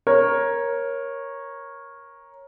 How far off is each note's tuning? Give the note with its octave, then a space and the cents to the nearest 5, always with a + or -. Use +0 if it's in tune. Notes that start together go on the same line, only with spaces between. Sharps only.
A#4 +10 C#5 -15